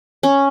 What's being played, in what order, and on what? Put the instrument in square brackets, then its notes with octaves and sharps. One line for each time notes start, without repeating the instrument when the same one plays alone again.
[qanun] C#4